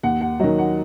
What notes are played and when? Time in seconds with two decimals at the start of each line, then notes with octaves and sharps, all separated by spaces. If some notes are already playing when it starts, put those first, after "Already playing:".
0.03 D#2 F#5
0.21 F#5
0.40 D#3 F#3 D#5
0.59 F#5